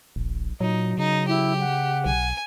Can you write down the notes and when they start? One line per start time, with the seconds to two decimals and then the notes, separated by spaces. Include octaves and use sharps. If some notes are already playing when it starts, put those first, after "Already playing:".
0.16 D#1 A#1
0.60 A#2 F#3 D#4
0.98 C#3 D#4
1.28 E4 G4
1.60 F#5
2.06 B1 G#5